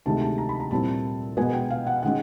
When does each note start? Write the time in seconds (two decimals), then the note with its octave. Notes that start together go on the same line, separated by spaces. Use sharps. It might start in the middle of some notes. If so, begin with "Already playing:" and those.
0.06 D2 C3 D#3 G#3 A5
0.22 A5
0.38 A#5
0.49 B5
0.60 A#5
0.71 A#2 G3 C4 E4 A5
1.37 B2 G#3 B3 G#5
1.53 G5
1.70 F5
1.87 F#5
2.03 D#3 G#3 C#4 F#5